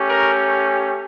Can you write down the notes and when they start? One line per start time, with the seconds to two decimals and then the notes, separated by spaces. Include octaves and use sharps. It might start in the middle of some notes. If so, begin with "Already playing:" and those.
Already playing: A3 C#4 G4
0.09 A#4